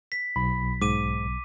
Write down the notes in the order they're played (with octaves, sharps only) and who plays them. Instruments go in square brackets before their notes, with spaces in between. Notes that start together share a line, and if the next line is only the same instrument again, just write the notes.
[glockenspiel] B6
[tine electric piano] B1 [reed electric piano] B5
[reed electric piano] G#2 [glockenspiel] D6 D#7